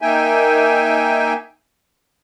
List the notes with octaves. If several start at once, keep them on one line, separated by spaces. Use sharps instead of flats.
A#3 D#4 E5 G5 G#5